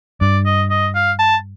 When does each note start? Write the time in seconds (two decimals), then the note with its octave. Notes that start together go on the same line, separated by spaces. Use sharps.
0.21 G2 D5
0.46 D#5
0.70 D#5
0.95 F5
1.19 A5